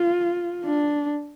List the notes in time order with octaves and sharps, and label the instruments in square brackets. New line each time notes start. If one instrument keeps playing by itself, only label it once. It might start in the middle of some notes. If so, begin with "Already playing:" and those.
Already playing: [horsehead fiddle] F4
D4